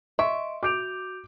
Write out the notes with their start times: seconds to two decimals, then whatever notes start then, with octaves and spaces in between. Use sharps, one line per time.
0.19 D#5 E5 C6 C#6 D7
0.63 F#4 D6 G6 D7 F7